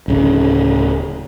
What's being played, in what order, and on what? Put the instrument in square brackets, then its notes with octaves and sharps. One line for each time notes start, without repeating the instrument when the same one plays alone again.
[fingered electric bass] D1 C#3